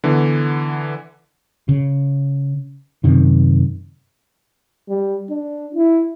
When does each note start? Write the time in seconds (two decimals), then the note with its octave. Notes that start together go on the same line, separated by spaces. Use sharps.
0.04 D3 E3 B3
1.69 C#3
3.04 F#2 C3 D#3
4.89 G3
5.30 D4
5.75 E4